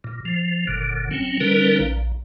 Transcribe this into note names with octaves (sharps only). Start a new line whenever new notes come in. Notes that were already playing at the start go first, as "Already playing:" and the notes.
A#2
F3
F#1 A#2 D3
F#3 C4 C#4
D3 G3 C#4 D#4 A#4 B4
A#1